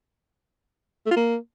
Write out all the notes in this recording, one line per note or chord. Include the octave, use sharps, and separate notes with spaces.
A3
F4
A#3